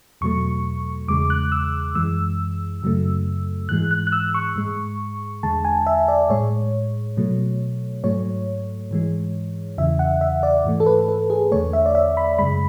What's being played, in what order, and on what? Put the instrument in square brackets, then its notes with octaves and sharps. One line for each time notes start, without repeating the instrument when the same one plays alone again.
[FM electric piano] E2 B2 F#3 A3 C#6
E2 C#3 G#3 D6
F#6
E6
F#2 E3 G#3 E6
F#2 C#3 F#3 A3
G#2 E3 G#3 F#6
F#6
F#6
E6
C#6
G#2 G#3
E2 D3 G#3 A5
G#5
E5
D5
A2 G#3 C#5
B2 F#3 A3
G#2 F#3 A3 C#5
G#2 E3 G#3
E2 C#3 E3 E5
F#5
E5
D5
G#2 E3 A3
A4
B4
A4
G#4
E2 D3 A3 C#5
E5
D5
E5
B5
F#2 C#3 G#3 B5